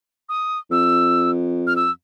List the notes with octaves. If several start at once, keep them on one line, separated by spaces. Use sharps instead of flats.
D#6
F2 E6
F6
E6